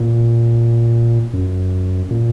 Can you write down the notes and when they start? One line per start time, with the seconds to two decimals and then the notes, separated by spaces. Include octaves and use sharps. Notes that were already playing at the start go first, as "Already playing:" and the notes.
Already playing: A#2
1.33 F#2
2.11 A#2